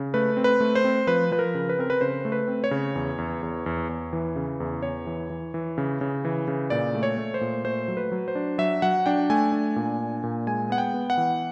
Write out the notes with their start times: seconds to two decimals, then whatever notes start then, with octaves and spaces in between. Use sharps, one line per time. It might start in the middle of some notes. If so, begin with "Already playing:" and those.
Already playing: C#3
0.14 A3 B4
0.37 C4
0.44 B4
0.60 A3
0.75 C5
0.84 C4
1.07 F3 B4
1.31 F3 B4
1.39 A#4
1.55 C#3
1.69 B4
1.78 C4 A#4
1.90 B4
2.01 C#3 C5
2.25 A3
2.32 B4
2.48 C4
2.64 C#5
2.71 C#3
2.96 E2
3.18 E2
3.43 E2
3.66 E2
3.89 E2
4.13 E3
4.36 C#3
4.60 E2
4.82 E2 C#5
5.07 E3
5.30 E3
5.54 E3
5.78 C#3
6.01 C#3
6.25 E3
6.48 C#3
6.70 A#2 D5
6.95 A3
7.03 C#5
7.18 A3
7.34 C5
7.41 A#2
7.65 A3 C5
7.88 F#3
7.97 B4
8.12 F#3
8.28 C5
8.35 D4
8.58 F#3 E5
8.82 F#3 F#5
9.06 D4 G5
9.30 A3 G#5
9.52 D4
9.76 A#2
9.99 D4
10.23 A#2
10.47 G#3 G#5
10.70 B3 F#5
10.78 G5
10.94 B3
11.10 F#5
11.17 E3